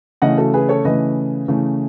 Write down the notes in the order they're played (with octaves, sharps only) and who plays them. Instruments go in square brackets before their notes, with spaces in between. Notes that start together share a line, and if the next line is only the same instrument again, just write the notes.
[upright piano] C#3 E3 A3 D#5 F#5
F#4 A4
G#4 B4
A4 C#5
C#3 E3 A3 B4 D#5
C#3 E3 A3